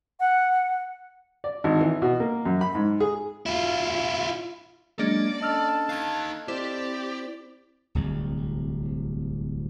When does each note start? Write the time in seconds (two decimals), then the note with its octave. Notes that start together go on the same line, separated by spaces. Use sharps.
0.20 F#5
1.44 D5
1.64 G#1
1.81 E3
2.02 B2
2.20 A#3
2.45 F#2
2.61 B5
2.75 G#2
3.00 G#4
3.46 E4 F4
4.99 F#3 G#3 A#3 C#4 D4 D5
5.42 A4 D#5 A5 E6 F6
5.89 D#4 F5 F#6 G#6
6.48 C4 E4 G4 C5 D5
7.95 D1 C2